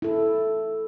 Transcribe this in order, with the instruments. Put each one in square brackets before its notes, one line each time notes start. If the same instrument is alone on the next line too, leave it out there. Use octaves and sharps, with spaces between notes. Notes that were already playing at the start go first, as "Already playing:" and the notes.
[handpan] E4 A4